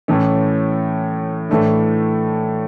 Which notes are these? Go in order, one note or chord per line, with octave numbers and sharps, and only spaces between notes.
A2 E3 A3 C#4
A2 E3 A3 D4